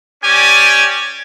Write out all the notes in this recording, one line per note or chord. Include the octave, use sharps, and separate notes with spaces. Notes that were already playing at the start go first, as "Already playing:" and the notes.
C#4 G4 D5 G#5